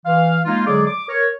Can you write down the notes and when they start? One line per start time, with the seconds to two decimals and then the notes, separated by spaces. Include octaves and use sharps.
0.06 E3 F5
0.45 G#3 A#3 D#4 F4
0.66 D3 F#3 G#3 G#4 D5 D6
0.86 D6
1.09 A#4 C#5